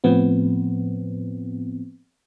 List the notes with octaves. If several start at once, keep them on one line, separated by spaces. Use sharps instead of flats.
A2 F3 B3 C4